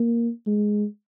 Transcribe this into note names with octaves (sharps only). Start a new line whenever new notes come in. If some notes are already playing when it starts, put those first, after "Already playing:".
Already playing: A#3
G#3